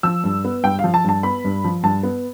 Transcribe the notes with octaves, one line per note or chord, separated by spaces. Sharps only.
F3 E6
G2
B3
G2 G5
F5
F3
A5
G2 A5
B3 B5
G2
F3
G2 A5
B3